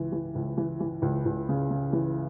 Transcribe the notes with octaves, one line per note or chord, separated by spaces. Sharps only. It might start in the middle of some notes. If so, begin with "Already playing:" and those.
Already playing: C#2 E3
E3
C#2
E3
E3
C#2
C#2
C#3
C#3
E3